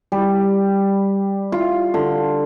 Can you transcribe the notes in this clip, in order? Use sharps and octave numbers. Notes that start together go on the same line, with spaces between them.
G3
F4
D3